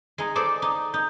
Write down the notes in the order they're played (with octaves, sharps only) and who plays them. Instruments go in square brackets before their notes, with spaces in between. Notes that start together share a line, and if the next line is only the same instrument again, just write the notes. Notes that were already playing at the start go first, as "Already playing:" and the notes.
[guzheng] G#3 D#4
[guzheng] A4 C5 D5 [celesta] D6 D#6
[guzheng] D#4
[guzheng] D#4 [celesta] G6